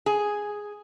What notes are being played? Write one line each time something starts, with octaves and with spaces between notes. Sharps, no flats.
G#4